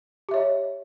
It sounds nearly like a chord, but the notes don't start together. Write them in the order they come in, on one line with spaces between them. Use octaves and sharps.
G4 E5 C#5 D#5